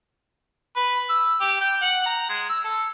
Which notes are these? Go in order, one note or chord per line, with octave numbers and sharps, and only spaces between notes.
B4
E6
G4
G5
F#5
A#5
G#3
E6
A4